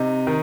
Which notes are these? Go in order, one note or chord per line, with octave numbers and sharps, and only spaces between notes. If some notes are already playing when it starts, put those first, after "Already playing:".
Already playing: C3 D#4
D#3